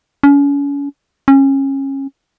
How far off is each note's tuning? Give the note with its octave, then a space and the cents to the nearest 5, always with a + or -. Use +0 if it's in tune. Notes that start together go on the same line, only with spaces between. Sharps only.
C#4 +35
C#4 -25